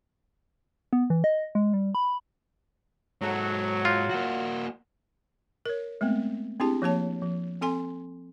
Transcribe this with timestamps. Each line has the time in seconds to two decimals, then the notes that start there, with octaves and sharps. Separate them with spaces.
0.93 B3
1.10 E3
1.24 D#5
1.55 G#3
1.74 G3
1.95 B5
3.21 G#2 F#3 A4
3.85 F4
4.10 A#3 F#4
5.66 A#4 C#5
6.01 G#3 A3 B3 C4
6.60 C4 D4 E4 G4 G#4 A5
6.82 F3 A#3 C#5 A5
7.22 F3
7.61 C4 A4 G#5 C6